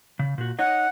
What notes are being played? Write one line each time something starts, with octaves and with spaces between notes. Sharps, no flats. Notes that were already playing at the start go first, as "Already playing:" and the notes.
C#3
A#2 F#4
D#4 C#5 D#5 F#5